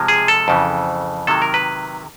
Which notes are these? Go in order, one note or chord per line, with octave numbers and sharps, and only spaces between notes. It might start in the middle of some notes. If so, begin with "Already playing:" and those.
Already playing: C3 F3 G#3
G#4
A4
F2 C#3 E3
C3 D#3 F#3 A4
A#4
B4